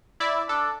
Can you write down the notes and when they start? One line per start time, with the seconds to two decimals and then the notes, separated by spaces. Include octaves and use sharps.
0.20 E4 D5 E5
0.49 D4 A4